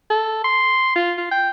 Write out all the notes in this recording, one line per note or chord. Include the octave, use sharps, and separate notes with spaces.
A4
C6
F4
F4
G5